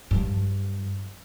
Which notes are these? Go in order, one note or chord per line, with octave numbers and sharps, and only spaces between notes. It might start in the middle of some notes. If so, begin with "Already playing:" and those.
G2 F#3